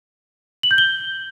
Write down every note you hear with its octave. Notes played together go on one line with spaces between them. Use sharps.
F#7
G6
G7